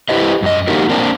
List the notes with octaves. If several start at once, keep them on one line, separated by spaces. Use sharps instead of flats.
E4 G4 B4 C5 D#5
F#2 D#5
A#3 D#4 F#4 G4 A#4
A#3 C4 D4